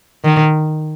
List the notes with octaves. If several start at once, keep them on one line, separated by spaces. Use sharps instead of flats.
D#3